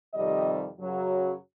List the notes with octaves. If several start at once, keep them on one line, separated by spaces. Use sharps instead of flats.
F2 C3 D#3 G3 D#5
F#2 C#3 F#3